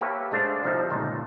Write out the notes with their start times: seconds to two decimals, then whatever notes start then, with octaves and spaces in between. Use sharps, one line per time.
0.01 A#3 G4 A4 B4 C#5 E5
0.31 G#3 A3 D4 C5 D5 F5
0.64 C2 F3 G3 D#4 E5
0.90 G1 C#2 A#2 D#4 A5